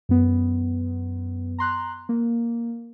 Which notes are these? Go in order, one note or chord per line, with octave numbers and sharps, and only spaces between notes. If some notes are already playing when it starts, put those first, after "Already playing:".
F#2 B3
A#5 C6 F#6
A#3